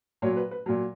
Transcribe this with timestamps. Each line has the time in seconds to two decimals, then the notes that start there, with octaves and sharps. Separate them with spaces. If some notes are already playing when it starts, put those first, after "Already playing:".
0.22 A#2 F#3 C#5
0.37 B4
0.51 B4
0.66 A#2 F#3